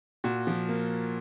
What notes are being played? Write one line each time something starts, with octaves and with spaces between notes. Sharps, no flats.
A#2 F#4
F3
A#3